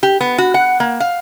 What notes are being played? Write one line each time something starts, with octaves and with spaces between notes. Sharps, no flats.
G4
B3
F#4
F#5
A#3
F5